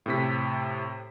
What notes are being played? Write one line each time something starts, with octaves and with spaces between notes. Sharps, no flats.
A2 C3 B6